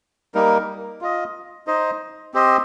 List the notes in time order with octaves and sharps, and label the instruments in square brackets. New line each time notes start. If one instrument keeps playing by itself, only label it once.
[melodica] G3 A#3 D#4 A#4
F4 D#5
D#4 C5 D#5
C4 G4 C5 D#5